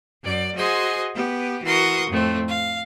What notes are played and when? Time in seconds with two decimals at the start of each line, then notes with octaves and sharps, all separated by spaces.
0.24 F#2 D5
0.56 F#4 G#4 C5 D#5 G#5 C6
1.15 B3 G4
1.64 E3 F#4 A#4 C6 C#6 D#6
2.10 F2 A2 A3 C4
2.48 F5